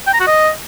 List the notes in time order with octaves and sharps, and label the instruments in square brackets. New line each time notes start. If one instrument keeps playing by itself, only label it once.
[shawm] G5
A#5
F#4
D#5